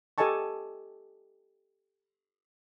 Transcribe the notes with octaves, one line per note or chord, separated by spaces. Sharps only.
G4 A4 D#5 G#5 A5 C#6